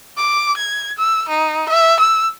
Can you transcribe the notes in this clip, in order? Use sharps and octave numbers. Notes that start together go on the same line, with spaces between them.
D6
G#6
E6
D#4
E5
E6